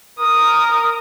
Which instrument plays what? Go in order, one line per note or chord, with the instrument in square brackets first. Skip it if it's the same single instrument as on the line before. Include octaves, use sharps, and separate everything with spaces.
[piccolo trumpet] A#4 [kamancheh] D#6